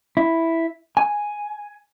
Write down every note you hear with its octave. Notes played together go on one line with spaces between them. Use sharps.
E4
G#5